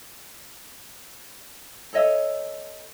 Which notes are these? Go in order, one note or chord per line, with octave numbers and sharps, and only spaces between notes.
A4 C#5 D#5 E5